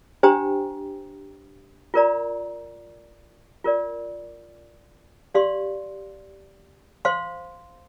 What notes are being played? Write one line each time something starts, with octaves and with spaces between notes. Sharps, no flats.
D4 G4 C5 G5 A#5
F4 A#4 D5 A#5
F4 A#4 D5
G4 D5 F5 C6
C5 F5 C6